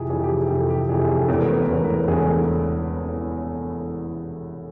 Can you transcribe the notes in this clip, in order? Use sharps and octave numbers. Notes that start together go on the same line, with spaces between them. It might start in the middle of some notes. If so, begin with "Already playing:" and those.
Already playing: F2 C3 E3 G4 G#4
F2 C3 E3 G#4
G4
G#4
F2 C3 E3 A4
G4
F2 C3 E3 G#4
G#4
A4
E1 E2 C#3 E3 A3 A#4
B4
A#4
B4
E1 E2 C#3 E3 A3 A#4
B4
A#4
E1 E2 C#3 E3 A3 G#4
A4
G#4